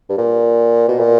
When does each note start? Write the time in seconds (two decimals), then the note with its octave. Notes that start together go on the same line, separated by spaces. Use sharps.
0.09 G2
0.18 A#2
0.88 B2
1.00 A#2